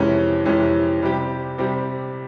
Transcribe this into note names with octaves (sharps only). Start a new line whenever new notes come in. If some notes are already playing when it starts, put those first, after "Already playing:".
Already playing: F2 C3 E3 G#3 C#4
F2 C3 E3 G#3 C#4
C3 G3 C4 G4
C3 G3 C4 G4